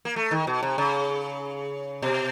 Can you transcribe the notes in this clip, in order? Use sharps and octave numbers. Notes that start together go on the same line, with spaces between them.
A#3
A3
D#3
B2
C3
C#3
B2